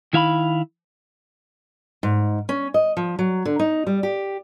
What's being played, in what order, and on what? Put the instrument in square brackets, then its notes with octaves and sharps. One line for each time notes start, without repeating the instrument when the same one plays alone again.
[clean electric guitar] D#3 E4 F5 A#5 B5
[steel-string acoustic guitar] G#2
C#4
D#5
F3
F#3
D3
D#4
G3
G4